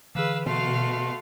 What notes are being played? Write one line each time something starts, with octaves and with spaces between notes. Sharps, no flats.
D3 E3 G#4 B4 F5 E6
B2 A3 F#4 F5 C6